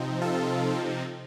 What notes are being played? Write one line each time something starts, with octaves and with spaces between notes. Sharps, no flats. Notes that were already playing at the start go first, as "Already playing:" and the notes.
Already playing: C3 F3 C4 D#4
F4 A4